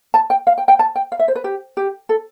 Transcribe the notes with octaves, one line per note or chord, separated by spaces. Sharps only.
A5
G5
F5
G5
G5
A5
G5
F5
E5
C5
B4
G4
G4
A4